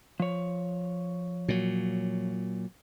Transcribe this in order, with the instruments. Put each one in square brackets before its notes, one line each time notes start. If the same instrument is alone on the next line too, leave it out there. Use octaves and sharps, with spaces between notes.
[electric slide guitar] F3 C#5
[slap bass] A#2 F#3